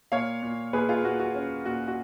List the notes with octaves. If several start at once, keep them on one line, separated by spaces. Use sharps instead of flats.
A#2 C#5 F5
A#2
A#2 G#4 B4
F4 G#4
A#2 F#4
F#4
C#4
A#2 F#4
F#4